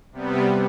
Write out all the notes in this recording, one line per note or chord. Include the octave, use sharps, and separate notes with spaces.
C3 G3 B3